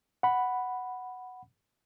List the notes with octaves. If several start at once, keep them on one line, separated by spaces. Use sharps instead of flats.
F#5 B5